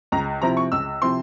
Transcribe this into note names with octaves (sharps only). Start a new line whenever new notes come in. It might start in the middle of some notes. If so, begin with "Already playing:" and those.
C#2 A#5
C3 F3 C4 E4 A#5
C#6
C#2 E6
C3 F3 C4 E4 C6